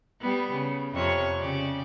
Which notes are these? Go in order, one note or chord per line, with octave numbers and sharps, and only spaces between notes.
G3 B3
C#3
F2 C3 C#5
C#3 G4 D5